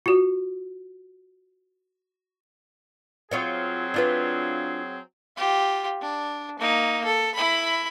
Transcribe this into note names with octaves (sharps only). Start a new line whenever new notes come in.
F4 F#4
F#3 C4 F4 G#4 C#5 F5
D4 F4 B4
F4 G4
D4
A#3 D#4
A4
E4 B5